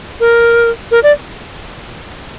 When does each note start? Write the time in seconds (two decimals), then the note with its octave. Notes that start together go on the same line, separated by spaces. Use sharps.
0.20 A#4
0.91 A#4
1.03 D5